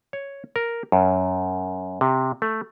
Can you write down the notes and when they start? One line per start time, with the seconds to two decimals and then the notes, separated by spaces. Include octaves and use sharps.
0.13 C#5
0.56 A#4
0.92 F#2
2.01 C3
2.42 A3